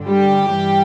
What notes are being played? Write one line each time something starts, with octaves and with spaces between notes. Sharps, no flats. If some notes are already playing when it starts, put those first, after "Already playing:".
Already playing: G2 D3
G3 G4
G2 E3 G3